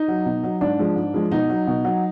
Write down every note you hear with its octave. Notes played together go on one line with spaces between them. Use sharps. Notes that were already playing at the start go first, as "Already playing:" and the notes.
Already playing: D#4
F#3
B2
F#3
G#2 D4
F3 G#3
G#2
F3 G#3
B2 D#4
F#3
B2
F#3